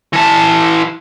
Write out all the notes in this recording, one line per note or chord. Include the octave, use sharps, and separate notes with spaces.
E3 A5